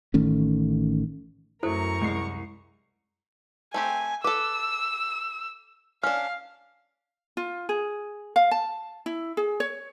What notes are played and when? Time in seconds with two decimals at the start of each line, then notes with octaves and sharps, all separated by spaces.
0.14 A1 D#3 A3 C#4
1.63 F#2 F#3 A3 E4 A4 A#4 C5 C#6
2.01 C2 G#3 C7
3.74 A3 C4 G4 G#5
4.24 A4 B4 D6 E6
6.03 C#4 D4 F5 F6
7.37 F4
7.69 G#4
8.36 F5
8.51 A5
9.06 E4
9.37 G#4
9.60 C#5